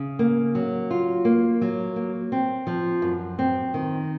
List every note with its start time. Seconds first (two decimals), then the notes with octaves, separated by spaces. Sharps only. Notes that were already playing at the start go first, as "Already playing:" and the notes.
Already playing: C#3
0.19 A#3
0.55 F#3
0.91 F4
1.25 A#3
1.61 F#3
1.96 A#3
2.32 C4
2.67 F3
3.02 F#2
3.39 C4
3.74 D#3